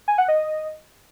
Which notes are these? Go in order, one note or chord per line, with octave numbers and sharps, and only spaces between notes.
G#5
F#5
D#5